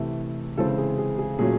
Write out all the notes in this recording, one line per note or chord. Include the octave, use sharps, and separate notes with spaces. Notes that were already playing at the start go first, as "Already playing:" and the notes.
Already playing: C3 E3 A3
C#3 E3 G#3 C4 A4
G#4
G#4
G#4
A#2 F#3 A3 C#4 G#4